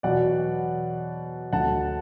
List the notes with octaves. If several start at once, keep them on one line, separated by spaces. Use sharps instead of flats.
E2 B2 F#3 D5 F#5
D2 D3 F#3 F#5 A5